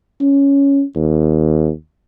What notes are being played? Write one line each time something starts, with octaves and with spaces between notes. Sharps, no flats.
C#4
D#2